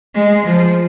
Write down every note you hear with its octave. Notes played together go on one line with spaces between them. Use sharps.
G#3
F3